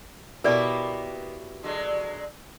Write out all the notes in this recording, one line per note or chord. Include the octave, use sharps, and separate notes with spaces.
B2 A#3 B3 E4 G4 A#4 B4 D5
D3 F#3 G#3